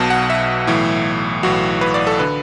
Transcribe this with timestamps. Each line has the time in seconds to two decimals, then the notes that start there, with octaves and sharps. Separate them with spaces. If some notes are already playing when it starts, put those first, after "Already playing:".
Already playing: B1 B2 A5
0.10 F#5
0.30 E5
0.67 B1 A2 E3
1.43 B1 A2 E3 F#4
1.81 B4
1.94 D5
2.07 A4
2.19 D3 B4